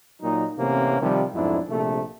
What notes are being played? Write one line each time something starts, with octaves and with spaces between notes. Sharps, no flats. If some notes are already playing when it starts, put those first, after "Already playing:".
A#2 F#3 D#4
A1 C3 A#3 B3 C#4
C3 D#3 F3 G3
B1 F2 G#2 D4 E4
A#1 C3 A3